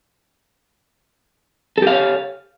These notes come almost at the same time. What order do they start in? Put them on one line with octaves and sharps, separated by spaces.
A4 G4 F5 C#5